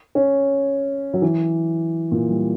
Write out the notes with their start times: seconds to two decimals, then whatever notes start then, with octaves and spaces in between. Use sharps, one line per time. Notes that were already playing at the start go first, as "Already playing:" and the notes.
0.15 C#4
1.14 F#3
1.22 E3
2.12 A#2
2.30 G3